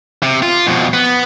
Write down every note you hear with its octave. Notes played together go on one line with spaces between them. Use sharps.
C3
F4
F2 B2
B3